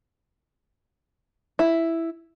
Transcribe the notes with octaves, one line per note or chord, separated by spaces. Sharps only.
E4